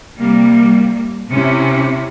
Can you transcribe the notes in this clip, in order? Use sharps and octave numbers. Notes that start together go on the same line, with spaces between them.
C3 G3 A#3
C3 C#4 E4